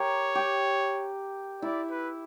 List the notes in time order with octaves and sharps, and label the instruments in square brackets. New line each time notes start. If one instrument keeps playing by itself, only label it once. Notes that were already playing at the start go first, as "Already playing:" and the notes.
Already playing: [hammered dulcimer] G4 A#4 [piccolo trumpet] C#5
[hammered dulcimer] G4
[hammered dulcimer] E4 [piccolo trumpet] D5
[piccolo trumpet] B4